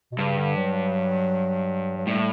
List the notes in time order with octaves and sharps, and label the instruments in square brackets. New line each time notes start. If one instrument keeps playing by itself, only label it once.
[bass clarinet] B2
[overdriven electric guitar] G2 [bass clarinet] C#3
[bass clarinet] D3
F#3
F#3
[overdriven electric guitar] A2 [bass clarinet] G3